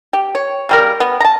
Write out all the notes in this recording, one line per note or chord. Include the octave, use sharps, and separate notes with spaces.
G4
C#5
C#3 G3 A#4
B3
A5 A#5